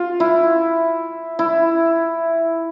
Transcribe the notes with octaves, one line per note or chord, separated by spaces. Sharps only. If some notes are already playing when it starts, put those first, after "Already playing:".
Already playing: F4
E4
E4